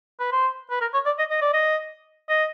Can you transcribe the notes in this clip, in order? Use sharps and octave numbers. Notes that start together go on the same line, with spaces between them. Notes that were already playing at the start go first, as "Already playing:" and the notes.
B4
C5
B4
A#4
C#5
D5
D#5
D#5
D5
D#5
D#5